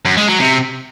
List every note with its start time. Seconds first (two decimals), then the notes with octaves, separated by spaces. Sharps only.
0.06 F#2
0.17 G#3
0.29 F#3
0.40 C3